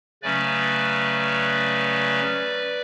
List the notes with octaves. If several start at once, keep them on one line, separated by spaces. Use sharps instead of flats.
C#3 F#3 A3 C#4 B4 D5